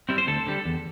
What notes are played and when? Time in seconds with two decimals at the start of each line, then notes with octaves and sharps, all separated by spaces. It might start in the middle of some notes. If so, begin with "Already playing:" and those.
0.09 G3 C4 E4
0.18 C5
0.27 D2 A4
0.47 D3 G3
0.65 E2